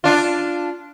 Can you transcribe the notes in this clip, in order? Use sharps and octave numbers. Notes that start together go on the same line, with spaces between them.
D4 F4